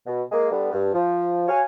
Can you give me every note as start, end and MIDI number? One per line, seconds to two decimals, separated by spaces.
0.06 0.22 47
0.31 0.50 56
0.31 0.50 58
0.51 0.69 50
0.51 0.69 55
0.51 0.69 59
0.72 0.91 43
0.93 1.46 53
1.48 1.62 66
1.48 1.62 73
1.48 1.62 77
1.48 1.62 78
1.48 1.62 80